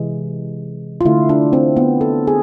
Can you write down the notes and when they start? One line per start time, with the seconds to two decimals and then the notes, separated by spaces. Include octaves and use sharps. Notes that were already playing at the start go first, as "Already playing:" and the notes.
Already playing: C3 E3 G#3
1.01 F4
1.05 D3 A3 E4
1.29 D4
1.53 C4
1.77 B3
2.01 A4
2.27 G#4